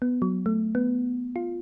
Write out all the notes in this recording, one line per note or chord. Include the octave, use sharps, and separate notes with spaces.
B3
F#3
A3
B3
F4